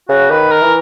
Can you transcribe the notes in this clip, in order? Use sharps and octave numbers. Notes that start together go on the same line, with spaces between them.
C#3 F#4
D#3 B4
A#4
E3